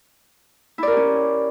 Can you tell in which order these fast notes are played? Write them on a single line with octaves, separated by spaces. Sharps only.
E4 D5 A#4 G4 C#4